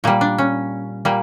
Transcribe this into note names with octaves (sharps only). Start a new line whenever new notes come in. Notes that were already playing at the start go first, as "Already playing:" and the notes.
A#2 G3 A#3
D4
C#4
A#2 G3 A#3